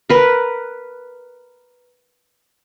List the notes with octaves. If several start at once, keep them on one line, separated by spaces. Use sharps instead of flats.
A#4 B4